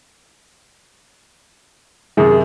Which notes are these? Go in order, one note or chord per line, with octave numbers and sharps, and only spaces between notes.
F#2 C3 D#3 G#4